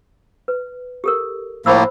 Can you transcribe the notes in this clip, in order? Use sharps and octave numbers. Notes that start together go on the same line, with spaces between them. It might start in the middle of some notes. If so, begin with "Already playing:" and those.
B4
G4 A4 A#4
A2 F3 A#3 C5 B5 E6